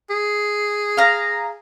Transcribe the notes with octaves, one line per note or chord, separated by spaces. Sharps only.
G#4
F5 A#5